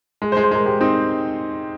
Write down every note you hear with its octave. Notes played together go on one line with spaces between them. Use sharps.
G#3
C5
G#3
C5
G#3 A#4
G#3 G4
C4 D#4